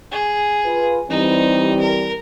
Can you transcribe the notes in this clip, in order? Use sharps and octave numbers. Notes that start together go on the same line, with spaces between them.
G#4
F4 B4
E3 G3 C4 D#4
A#4